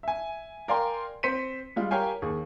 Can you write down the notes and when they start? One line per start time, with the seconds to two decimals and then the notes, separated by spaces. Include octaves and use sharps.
0.03 E5 G#5
0.68 A#4 D5 F5 G5 G#5 C6
1.23 C4 C5 B6 C#7 D#7
1.76 G3 G#3 F4
1.91 G4 A#4 C#5 F5 G5 G#5
2.22 D#2 G#4